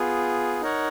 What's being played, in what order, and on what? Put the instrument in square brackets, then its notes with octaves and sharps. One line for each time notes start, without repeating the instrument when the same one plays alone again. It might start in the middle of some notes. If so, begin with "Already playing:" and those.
Already playing: [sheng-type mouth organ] B3 F4 G#4
D#4 A#4 C#5 F#5